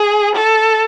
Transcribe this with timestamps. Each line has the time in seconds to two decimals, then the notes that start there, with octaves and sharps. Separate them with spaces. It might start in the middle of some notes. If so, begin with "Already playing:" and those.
Already playing: G#4
0.35 A4